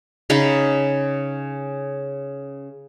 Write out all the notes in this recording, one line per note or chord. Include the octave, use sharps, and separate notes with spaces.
C#3 D#4 B5